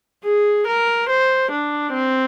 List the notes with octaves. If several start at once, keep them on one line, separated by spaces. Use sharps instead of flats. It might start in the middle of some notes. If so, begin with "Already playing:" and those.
G#4
A#4
C5
D4
C4